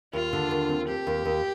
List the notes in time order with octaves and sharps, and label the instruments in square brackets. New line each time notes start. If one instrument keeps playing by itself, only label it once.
[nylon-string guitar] D#2 [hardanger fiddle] F4
[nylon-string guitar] D3
D#2
C4
[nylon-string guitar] C4 [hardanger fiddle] G4
[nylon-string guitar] D#2
D#2